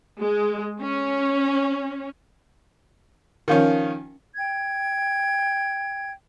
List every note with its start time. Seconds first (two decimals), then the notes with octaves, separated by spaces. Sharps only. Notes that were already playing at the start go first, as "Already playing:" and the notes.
0.20 G#3
0.82 C#4
3.48 D#3 F3 C#4
4.36 G5 G#6